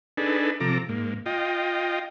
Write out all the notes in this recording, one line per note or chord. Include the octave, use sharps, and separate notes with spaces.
D4 D#4 G#4 A4 B4
C3 F3 A4 A#5 D6
G#2 A#3
F4 D#5 G5